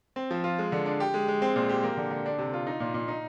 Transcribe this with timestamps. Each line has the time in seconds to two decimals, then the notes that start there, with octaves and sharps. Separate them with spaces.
0.16 C4
0.31 F3
0.44 F4
0.59 G#3
0.72 D3
0.86 D4
1.00 G4
1.14 G#3
1.28 G#3
1.42 C4
1.56 A#2
1.69 G4
1.84 A#3
1.97 D3
2.11 D3
2.26 D4
2.38 C3
2.54 F4
2.67 D#4
2.80 A#2
2.94 A#2
3.08 D#4